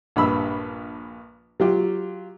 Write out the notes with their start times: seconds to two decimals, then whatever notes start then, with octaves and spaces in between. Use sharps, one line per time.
0.16 A#1 G2 B5 E6
1.60 F#3 F4 G4